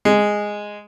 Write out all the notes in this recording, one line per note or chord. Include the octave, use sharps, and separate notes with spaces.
G#3